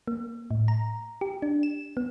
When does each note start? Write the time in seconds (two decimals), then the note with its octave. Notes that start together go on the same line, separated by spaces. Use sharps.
0.08 A#3
0.51 A2
0.68 A#5
1.21 G4
1.42 D4
1.63 E7
1.97 B3